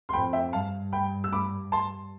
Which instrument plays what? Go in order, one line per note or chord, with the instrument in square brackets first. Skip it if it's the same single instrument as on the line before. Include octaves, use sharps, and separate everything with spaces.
[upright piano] C6
[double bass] F2 [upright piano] G5 B5
[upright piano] E5 G5
[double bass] G2 [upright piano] F5 A5
[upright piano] G5 B5
E6
B5 D6
A5 C6